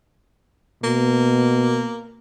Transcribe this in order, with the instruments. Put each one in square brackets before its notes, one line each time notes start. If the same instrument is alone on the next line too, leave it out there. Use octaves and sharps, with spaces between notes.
[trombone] B2 [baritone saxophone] A#3